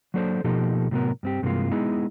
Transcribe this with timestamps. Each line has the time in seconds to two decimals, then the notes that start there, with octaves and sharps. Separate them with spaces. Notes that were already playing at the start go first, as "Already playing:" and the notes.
0.14 F#3 A#3 D4 A4 B4 C5
0.44 B2 F3 A#3 D#4 G4 A4
0.91 A2 C3 F#3 A#3 B3 A#4
1.23 G2 C4 G4
1.42 G2 C3 E3 G#3 A#3 F4
1.71 G#3 B3 D#4 E4 G#4